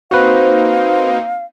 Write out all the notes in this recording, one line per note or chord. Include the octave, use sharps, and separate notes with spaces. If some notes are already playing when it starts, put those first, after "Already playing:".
A#3 C4 D#4 F#4 B4 C5 F5